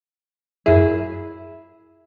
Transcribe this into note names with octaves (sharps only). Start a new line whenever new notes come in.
F#2 E4 G#4